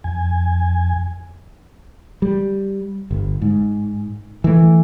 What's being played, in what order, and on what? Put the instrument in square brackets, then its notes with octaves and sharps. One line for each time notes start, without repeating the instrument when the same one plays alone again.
[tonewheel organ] F2 G#5
[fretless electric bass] G3
G1
G#2
E3 A3